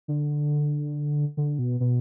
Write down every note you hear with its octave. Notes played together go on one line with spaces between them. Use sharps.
D3
D3
B2
B2